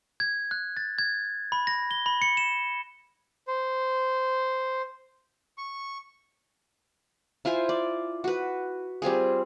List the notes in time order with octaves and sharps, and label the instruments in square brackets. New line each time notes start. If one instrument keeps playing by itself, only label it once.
[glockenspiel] G#6
F#6
A6
G#6
B5
A#6
G7
B5
C#7
E7
[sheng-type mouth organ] C5
C#6
[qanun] E4 F4 C5 G#5
D5
F#4 B4
G3 C4 F4 G#4